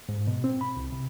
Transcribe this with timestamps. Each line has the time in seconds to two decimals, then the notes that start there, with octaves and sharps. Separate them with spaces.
0.09 G#2
0.27 B2
0.44 C4
0.61 B5
0.77 C2
0.92 C3